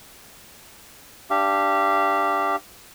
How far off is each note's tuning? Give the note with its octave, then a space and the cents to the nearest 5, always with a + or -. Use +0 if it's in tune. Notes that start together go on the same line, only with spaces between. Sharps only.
D4 +0 G4 +0 F5 -30